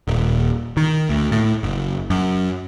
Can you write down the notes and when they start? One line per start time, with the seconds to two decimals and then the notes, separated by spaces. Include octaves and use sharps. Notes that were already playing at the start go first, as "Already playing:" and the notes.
0.08 D#1
0.77 D#3
1.10 D2
1.32 A2
1.63 F#1
2.10 F#2